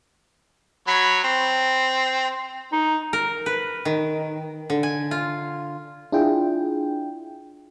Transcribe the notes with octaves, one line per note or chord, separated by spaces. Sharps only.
F#3 C#5 B5
C4
D#4
A#4
B4
D#3
D3
G#5
F4
D4 E4 F4 G#4 G5